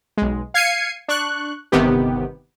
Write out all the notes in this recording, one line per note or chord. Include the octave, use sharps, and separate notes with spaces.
B1 G#3
F5 G#6 C7 C#7 D#7
D4 C#6 F#6
G1 C3 D#3 B3 G4